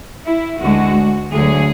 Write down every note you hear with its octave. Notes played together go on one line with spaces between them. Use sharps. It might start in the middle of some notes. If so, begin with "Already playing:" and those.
E4
D2 D3 G#3 F#4
D2 D3 F#3 G#4